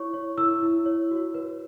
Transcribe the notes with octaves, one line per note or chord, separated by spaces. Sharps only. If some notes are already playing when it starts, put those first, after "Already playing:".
Already playing: E4 C#5 C#6
C#5
E4 E6
E4
C#5
F#4
B4